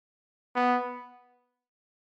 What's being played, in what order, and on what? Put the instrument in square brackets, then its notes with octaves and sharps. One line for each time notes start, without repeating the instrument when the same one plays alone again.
[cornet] B3